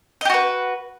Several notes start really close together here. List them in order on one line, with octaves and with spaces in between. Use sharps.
D#5 G4 F#4 B4